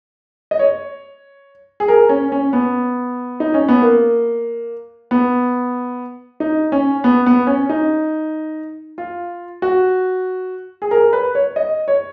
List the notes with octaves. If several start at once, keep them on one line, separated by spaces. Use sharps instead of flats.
D#5
C#5
G#4
A#4
C#4
C#4
B3
D#4
C#4
B3
A#3
B3
D#4
C#4
B3
B3
C#4
D#4
F4
F#4
G#4
A#4
B4
C#5
D#5
C#5